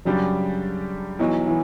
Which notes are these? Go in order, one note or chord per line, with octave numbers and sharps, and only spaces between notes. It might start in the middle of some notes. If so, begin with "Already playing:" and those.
F#2 C#3 F#3 G3 D4 G4
B1 B2 E3 F#3
E3